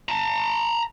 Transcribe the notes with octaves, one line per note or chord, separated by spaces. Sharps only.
A5 A#5